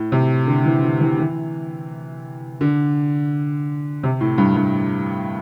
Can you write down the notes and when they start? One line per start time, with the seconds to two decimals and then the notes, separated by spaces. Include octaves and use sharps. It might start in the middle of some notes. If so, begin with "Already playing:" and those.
Already playing: A2
0.12 C3
0.47 D3
0.65 E3
0.84 D3
1.01 E3
1.19 E3
2.61 D3
4.03 C3
4.21 A2
4.38 G2
4.56 G2